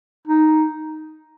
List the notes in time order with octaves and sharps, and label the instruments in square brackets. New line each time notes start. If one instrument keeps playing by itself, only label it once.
[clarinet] D#4